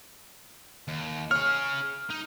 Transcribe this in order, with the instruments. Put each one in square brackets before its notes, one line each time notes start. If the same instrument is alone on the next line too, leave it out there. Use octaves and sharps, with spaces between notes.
[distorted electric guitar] D#2
[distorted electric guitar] G#4 C#5 [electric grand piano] F6
[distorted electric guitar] D#4